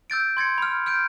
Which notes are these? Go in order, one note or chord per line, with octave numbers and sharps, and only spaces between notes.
E6 G6 A6 D7
C6 G#6 A6 C#7
B5 F6
F6 G6 D7